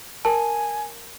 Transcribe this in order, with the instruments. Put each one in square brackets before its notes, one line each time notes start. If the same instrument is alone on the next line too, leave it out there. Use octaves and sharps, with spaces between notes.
[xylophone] A#4 A5 [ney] G#5